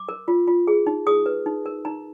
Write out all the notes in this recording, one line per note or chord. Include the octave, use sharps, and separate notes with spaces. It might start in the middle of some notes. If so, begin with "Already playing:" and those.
Already playing: D6
A#4
F4
F4
G#4
D#4
G#4 D#6
B4
D#4
A#4
D#4 A#5